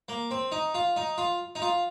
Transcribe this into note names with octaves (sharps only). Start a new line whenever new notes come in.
A#3
C4
D#4
F4
D#4
F4
D#4
F4